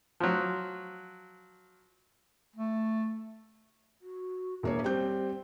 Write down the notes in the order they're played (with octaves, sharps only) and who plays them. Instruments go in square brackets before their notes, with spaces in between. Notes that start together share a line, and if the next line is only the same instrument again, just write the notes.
[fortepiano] F3 F#3
[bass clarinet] A3
[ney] F#4
[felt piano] E1 A#3 C#5 [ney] E5
[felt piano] G3 C4 G6 [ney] C5